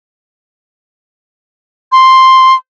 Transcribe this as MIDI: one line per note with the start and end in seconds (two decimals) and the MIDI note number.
1.92 2.54 84